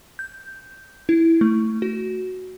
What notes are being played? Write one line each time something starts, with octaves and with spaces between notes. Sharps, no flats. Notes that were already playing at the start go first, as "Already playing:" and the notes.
G6
E4
A3
F#4